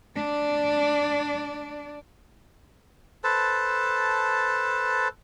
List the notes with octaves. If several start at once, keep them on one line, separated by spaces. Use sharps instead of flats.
D4 D5
A4 B4 C5 A5